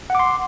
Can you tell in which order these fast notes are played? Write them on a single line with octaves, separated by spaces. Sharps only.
F#5 D6 C6